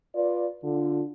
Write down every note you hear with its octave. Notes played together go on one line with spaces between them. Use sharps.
F4 B4 D5
D3 F4